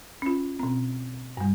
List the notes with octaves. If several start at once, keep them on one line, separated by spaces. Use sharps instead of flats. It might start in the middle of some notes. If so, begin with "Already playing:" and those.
C#4 F4
B2 C4
G2 G3